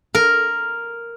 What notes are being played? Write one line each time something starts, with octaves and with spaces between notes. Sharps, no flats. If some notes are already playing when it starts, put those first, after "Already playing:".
A#4